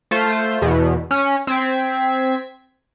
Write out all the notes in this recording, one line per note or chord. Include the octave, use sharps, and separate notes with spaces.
A3 F4 C5
E2 B2
C#4
C4 G#6 B6